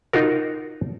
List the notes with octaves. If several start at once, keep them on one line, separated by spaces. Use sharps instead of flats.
D#4 F4 F#4 A#4